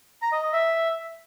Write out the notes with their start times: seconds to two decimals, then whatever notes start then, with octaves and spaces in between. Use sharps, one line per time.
0.22 A#5
0.32 D#5
0.43 D#5
0.53 E5